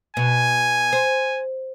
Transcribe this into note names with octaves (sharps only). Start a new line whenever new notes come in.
B2 G#5
C5